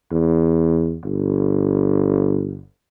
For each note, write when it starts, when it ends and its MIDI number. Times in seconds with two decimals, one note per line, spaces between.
0.11 1.00 40
1.04 2.67 31